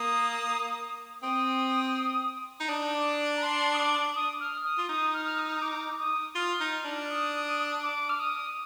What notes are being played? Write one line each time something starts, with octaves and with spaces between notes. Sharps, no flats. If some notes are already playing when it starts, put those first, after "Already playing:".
Already playing: A#3 D#6
C4 D#6
D#4
D4 D#6
D6
A#5
C6
D#6
D6
D#6
F6
D#6
F4
D#4 D#6
F6
F6
D#6
D#6
D6
D#6
F4 F6
D#4
F6
D4
F6
D#6
D6
F6
D#6